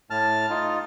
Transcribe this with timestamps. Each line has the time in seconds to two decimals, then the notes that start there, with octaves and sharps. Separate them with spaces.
0.10 A2 A5 F6
0.50 D#4 F4